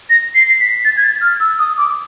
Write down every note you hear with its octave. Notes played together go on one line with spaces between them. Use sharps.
A#6
C7
B6
A6
G#6
A6
F6
E6
D#6
D6